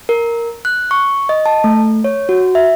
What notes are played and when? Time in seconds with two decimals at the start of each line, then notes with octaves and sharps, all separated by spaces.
0.09 A#4
0.65 F#6
0.91 C#6
1.29 D#5
1.46 A5
1.64 A3
2.04 C#5
2.29 F#4
2.55 E5